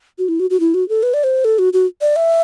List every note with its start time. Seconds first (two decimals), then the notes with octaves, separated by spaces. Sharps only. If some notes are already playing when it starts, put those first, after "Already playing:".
0.18 F#4
0.29 E4
0.40 F#4
0.50 F#4
0.60 E4
0.74 F#4
0.89 A4
1.03 B4
1.14 D5
1.24 C5
1.45 A4
1.59 F#4
1.73 F#4
2.01 D5
2.16 E5